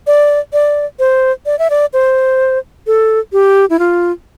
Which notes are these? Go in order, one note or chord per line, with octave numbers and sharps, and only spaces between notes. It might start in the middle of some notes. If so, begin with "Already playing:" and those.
D5
D5
C5
D5
E5
D5
C5
A4
G4
E4
F4